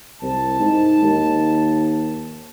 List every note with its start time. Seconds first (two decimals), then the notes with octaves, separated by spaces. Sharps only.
0.22 C2 A5
0.60 G#2
1.02 D#2